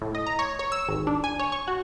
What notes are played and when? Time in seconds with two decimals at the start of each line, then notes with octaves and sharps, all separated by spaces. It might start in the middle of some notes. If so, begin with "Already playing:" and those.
0.02 A2
0.15 D#5
0.27 A#5
0.39 C#5
0.59 C#5
0.72 E6
0.89 G#1
1.07 D4
1.24 G#5
1.39 C#5
1.52 C#6
1.68 F#4